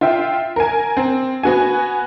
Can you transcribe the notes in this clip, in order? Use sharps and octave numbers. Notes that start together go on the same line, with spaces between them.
F4 E5 G5
A#4 G#5
C4
B3 F#4 G#5